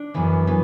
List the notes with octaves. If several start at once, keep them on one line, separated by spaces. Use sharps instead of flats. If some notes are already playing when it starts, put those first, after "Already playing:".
Already playing: D4
F#2 E3 B3
E3 B3